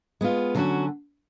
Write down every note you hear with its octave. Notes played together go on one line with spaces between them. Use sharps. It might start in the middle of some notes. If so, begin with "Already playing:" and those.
G#3 B3 F4
D3 F#3 C#4 F#4